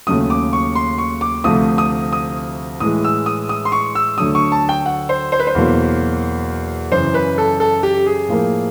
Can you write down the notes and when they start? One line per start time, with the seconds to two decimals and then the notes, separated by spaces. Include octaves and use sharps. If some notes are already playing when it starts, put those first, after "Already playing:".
0.07 D#2 C#3 F#3 A3 D#6
0.30 D6
0.53 C#6
0.75 C6
0.98 C#6
1.21 D6
1.44 D2 C3 F3 A3 D#6
1.78 D#6
2.13 D#6
2.80 A2 E3 G#3 D#6
3.04 E6
3.26 D#6
3.49 D#6
3.65 C6
3.72 C#6
3.95 E6
4.17 D2 D3 F#3 A3 D#6
4.35 C#6
4.52 A5
4.69 G5
4.86 F#5
5.09 C5
5.32 C5
5.39 B4
5.47 C5
5.55 E2 B2 F#3 A#3
6.92 F#2 C#3 E3 C5
7.14 B4
7.38 A4
7.60 A4
7.83 G4
8.06 G#4
8.28 A2 F3 A#3